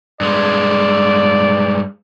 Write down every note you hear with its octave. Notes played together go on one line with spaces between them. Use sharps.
G2 G#3 D5